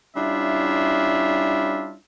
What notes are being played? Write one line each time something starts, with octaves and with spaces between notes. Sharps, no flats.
G3 C#4 D4 E4 F4 E5